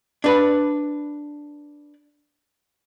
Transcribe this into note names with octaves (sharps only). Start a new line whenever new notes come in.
D4 B4